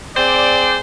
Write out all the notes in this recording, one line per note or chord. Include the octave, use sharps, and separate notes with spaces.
C4 G#4 C5 D5